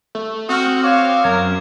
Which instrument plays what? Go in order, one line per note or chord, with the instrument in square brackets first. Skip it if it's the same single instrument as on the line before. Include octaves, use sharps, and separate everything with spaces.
[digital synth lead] A3
[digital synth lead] C4 [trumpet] F#4 [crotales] D#6 F6
[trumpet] C#5 [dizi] F5 [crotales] D6 F#6
[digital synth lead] F#2 [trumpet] A#4 [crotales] G#6